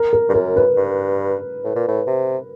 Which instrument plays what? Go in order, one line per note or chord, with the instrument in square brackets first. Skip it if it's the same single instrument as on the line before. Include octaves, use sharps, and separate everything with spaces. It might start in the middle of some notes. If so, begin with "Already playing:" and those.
Already playing: [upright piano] A#4
A#4
[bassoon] G2
[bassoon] F#2 [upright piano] A#4
[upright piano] B4
[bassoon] G2
A2
A#2
A2
C3